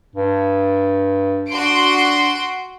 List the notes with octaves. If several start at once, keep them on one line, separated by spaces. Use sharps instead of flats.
G2
D4 F#4 C6 D7